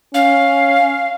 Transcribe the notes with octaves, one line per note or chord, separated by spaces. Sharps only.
C#4 F5